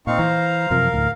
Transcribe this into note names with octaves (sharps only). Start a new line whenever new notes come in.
A#2 C4 D#4 F5 C#6
E3 C5 A#5
F#2 C3 F3 A#4
D2 A2